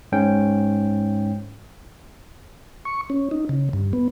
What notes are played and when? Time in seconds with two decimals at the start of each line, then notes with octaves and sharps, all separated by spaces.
0.12 G#2 C#4 G5
2.85 C#6
3.10 C#4
3.31 D#4
3.49 C#3
3.73 G2
3.93 B3